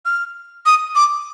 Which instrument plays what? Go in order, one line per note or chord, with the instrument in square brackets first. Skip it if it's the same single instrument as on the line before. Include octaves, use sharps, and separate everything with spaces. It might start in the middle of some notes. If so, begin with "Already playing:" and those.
[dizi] F6
D#6
D6